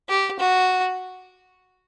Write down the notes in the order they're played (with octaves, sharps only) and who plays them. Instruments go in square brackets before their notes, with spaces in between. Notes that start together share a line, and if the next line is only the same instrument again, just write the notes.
[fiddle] G4
F#4